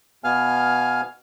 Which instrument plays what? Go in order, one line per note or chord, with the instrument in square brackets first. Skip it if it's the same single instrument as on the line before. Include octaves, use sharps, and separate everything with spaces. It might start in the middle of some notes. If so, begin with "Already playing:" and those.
[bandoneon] B2 B3 F5 G#5 F6